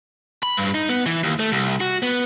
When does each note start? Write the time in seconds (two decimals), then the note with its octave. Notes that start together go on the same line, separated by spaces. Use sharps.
0.43 B5
0.57 G2
0.74 D#4
0.89 B3
1.06 E3
1.23 D#2
1.39 A3
1.52 C2
1.81 F#4
2.03 B3